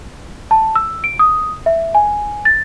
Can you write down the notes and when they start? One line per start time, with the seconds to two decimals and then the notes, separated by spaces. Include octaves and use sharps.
0.51 A5
0.76 E6
1.04 D7
1.19 D#6
1.66 E5
1.95 G#5
2.45 A6